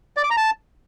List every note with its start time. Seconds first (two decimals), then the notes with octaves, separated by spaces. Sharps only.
0.17 D5
0.24 D6
0.30 A#5
0.37 A5